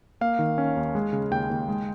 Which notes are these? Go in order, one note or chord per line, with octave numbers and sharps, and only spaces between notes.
A#3 F5
D#3
C#4
D#2
G#3
C#3
D#2 G5
D#2
G#3